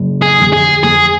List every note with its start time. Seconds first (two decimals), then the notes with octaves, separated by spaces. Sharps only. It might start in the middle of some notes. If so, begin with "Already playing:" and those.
Already playing: F#1
0.22 G#4
0.38 F2 D3
0.53 G#4
0.83 F2 G#4